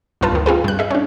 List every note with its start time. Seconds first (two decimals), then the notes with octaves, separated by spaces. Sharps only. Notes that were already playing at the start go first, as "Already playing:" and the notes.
0.21 B1 G2 F4 B4 A5
0.32 D2 D#3
0.46 C4 F4 G#4 B4
0.64 G2 F#6
0.79 G#4 D#5 E5
0.91 C#4 D4